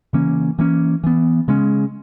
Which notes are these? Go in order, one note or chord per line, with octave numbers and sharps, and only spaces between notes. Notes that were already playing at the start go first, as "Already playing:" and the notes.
C#3 E3 A#3 C#4
E3 A#3 C#4
E3 B3
C#3 G#3 C#4